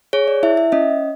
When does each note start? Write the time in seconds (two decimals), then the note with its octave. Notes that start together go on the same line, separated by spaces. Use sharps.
0.13 G#4 C#5
0.28 D5
0.43 E4 E5
0.57 E5
0.72 C#4 D#5